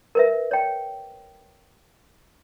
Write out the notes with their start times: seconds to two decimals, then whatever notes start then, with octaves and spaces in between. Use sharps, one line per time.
0.15 A#4 B4 E5
0.51 C#5 G5